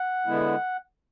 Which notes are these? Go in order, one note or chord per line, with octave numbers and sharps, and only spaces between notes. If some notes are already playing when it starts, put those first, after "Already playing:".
Already playing: F#5
D3 G#3 B3 E4